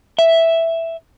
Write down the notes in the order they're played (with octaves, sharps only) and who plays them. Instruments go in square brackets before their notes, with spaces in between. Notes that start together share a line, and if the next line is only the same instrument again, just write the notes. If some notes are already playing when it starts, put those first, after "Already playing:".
[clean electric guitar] E5